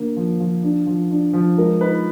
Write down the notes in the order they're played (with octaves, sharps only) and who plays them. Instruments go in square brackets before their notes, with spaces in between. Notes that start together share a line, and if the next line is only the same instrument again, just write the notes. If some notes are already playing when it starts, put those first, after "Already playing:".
Already playing: [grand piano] D3 A#3
F3
F3
D4
F3
D4
F3
G#3 A#4
D#4 B4